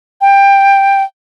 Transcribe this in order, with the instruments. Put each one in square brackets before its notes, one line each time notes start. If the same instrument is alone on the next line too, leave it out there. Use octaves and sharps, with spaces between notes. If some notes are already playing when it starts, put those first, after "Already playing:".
[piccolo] G5